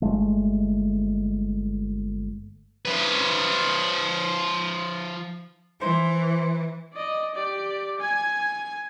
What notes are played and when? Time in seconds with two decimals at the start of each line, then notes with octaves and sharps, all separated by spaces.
0.02 G1 G#3 A3
2.85 F3 B4
5.81 E3 C5
6.94 D5 D#5
7.35 G4 D5
8.00 G#5 G#6